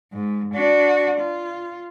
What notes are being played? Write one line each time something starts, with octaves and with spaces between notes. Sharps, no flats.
G#2
D4 F#4
F4